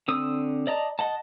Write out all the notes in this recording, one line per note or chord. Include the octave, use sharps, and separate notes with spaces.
D3 C4 D#6 E6
D5 D#5 A5 A#5
D#5 F#5 A5